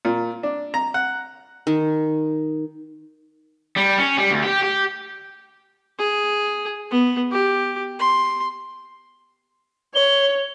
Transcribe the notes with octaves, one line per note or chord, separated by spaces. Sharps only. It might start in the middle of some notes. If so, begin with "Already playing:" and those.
A#2
D4
A#5
F#5
D#3
G3
C#4
G3
D2
G4
G4
G#4
B3
G4
C6
C#5 G7